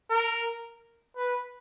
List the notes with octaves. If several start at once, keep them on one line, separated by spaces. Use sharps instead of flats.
A#4
B4